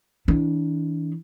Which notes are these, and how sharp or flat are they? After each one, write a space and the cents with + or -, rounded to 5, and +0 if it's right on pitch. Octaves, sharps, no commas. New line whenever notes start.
E3 -40 D4 -35